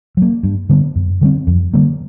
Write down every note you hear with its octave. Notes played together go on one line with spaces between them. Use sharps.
F#3 A#3
G2
D3 G3 B3
F#2
D3 G3 C4
F2
D3 G3 A#3